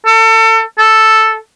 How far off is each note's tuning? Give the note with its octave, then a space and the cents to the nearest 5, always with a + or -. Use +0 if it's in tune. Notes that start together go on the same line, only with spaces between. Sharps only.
A4 +30
A4 +0